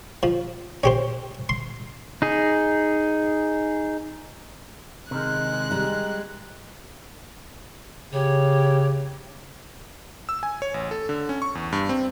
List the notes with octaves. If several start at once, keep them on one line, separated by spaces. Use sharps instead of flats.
F3
C#4 G4 C5
C6
D#4 G#4
C3 D#3 G#3 F#6
G3 A#5
C#3 G4 C#5
E6
G#5
C#5
A1
A4
D3
C#4
C#6
E2
G2
C4